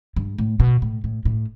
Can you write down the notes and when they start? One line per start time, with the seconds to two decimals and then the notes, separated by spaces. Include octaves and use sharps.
0.16 G2
0.38 A2
0.60 B2
0.82 A2
1.04 A2
1.25 A2